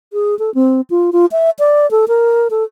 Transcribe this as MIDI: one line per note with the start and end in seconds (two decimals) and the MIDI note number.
0.13 0.38 68
0.39 0.53 69
0.55 0.81 60
0.90 1.10 65
1.13 1.26 65
1.32 1.50 76
1.59 1.89 74
1.91 2.05 69
2.08 2.48 70
2.50 2.64 69